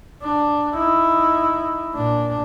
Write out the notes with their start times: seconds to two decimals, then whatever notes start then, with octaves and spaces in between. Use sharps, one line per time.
0.23 D4
0.76 D#4 E4
1.95 A#2 D4